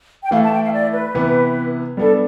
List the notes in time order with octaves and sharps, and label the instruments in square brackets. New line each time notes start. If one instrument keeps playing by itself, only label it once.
[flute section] G5
[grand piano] E3 A3 E4 A4 [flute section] F5
[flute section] A5
G5
F5
D5
B4
[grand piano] C3 E3 B3
[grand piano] G3 B3 D4 [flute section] A4